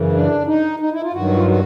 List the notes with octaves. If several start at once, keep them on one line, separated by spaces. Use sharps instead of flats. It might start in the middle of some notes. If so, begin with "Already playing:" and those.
Already playing: F#2 C#3 E3
D4
D#4
D#4
E4
F4
G2 D#3 F#3 F#4
F4
F#4